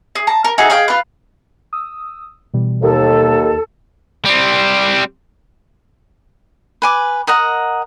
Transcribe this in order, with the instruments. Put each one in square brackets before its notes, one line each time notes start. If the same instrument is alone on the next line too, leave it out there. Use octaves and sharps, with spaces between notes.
[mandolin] G#4
A5 A#5
A#4
D#4 F#4 G#4 A4
G#4 D#5 F5 G5
F4 B4
[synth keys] D#6 E6
B2 E3 G3
[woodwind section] D#2 [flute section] A4
[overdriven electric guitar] G3 C4
[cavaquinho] B4 G#5 D6
A#4 D#5 F#5 A#5